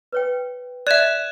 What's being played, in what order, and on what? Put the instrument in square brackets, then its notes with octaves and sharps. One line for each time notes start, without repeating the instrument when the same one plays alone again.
[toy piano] B4 C#5 G5
[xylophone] D5 E5 [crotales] F#6 G#6 E7